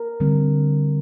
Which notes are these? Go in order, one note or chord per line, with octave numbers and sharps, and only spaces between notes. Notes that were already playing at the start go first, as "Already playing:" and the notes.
Already playing: A#4
D3 G3 C4